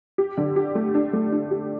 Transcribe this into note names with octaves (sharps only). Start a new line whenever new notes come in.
G4
D3
G4
A3
D4
A3
D4
G4